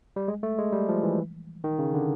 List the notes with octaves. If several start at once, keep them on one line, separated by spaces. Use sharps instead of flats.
G3
G#3
A3
G#3
G3
F3
E3
D#3
C#3
D3